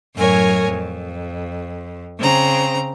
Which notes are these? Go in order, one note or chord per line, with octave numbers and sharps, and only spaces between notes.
F#2 A2 F#3 A#4 C#5 G#5
F2
C#3 C4 A#5